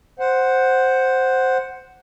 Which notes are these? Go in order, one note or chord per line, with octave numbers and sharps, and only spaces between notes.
C5 F#5